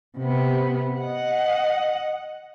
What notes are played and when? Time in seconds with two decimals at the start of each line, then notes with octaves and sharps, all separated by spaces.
0.18 C3 B3
1.00 D#5 F#5